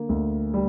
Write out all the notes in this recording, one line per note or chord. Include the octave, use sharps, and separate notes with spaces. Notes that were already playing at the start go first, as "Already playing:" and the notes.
Already playing: D3 A#3
D2
G3